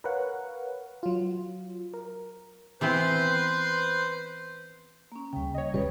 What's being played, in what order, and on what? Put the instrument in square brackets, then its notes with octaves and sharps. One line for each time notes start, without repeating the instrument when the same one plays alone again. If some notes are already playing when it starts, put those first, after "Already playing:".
[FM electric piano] A#4 B4 C#5 F5 F#5
F#3 F4
A#4
[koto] E3 B3 C4 [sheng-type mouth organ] B4 C5 C6
[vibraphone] A#3 C#4
[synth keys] D2 C#3 [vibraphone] G3 G5
[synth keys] C#5 D#5
[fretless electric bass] D#1 C#2 G3 [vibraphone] B4